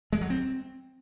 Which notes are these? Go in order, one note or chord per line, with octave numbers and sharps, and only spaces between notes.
G#3
F#3
C4